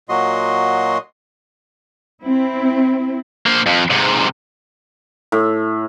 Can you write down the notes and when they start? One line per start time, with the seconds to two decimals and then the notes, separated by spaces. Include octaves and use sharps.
0.09 A#2 F#3 F#4 D#5 C6
2.24 C4 E4
3.46 A#3 C5
3.66 F2
3.91 G#2 C3
5.32 A2